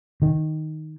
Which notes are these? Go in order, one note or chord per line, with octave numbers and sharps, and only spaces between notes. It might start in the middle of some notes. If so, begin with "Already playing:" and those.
D#3